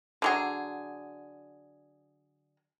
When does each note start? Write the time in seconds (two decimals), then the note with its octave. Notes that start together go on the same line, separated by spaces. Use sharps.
0.22 D3 F#3 G#4